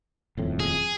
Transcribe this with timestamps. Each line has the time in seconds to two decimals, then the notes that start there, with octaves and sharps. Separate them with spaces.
0.37 D#1 F2 A2
0.60 G#4